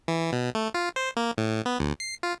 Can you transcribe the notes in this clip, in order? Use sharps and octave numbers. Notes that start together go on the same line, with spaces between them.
E3
B2
A3
F4
C5
A#3
A2
B3
D2
C7
F4